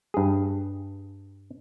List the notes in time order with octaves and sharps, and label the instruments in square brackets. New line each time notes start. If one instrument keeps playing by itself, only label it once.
[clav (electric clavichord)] G2 G#4